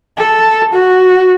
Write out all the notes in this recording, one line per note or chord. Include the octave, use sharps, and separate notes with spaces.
A4
F#4